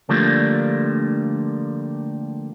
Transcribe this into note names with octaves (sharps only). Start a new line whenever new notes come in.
D3 F3 G3 A3 A#3 D4